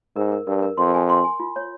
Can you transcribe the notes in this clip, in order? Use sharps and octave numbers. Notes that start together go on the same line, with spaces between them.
G#2 A#4
A#4
G2 A#4
A#4
F2 C6
G#5
C6
G#5
F4
C#5